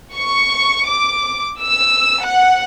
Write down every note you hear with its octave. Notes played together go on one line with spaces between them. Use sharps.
C#6
D6
E6
F#5